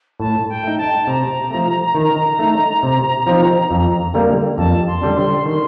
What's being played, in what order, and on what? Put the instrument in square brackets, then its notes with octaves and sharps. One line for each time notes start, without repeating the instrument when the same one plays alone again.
[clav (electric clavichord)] A2 [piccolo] A5
[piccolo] G5
[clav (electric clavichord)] A3 D#4
[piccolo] A5
[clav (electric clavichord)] C3 [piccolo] A#5
[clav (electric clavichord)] F3 A3
D#3
A3 D#4
C3
F3 C4 D#4
F2
D3 G3 A#3
[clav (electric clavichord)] F2 [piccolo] A5
[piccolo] C6
[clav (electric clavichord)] D3 G3 D4
[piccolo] C6
[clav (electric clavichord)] D#3 [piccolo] C6